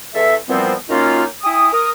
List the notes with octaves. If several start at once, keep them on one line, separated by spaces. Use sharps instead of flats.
E2 A4 E5
A#2 E3 F3 G3 B3 C4
F#2 D#3 A#3 C#4 D#4 F4
E4 G5 G#5 D#6
A#4 D#6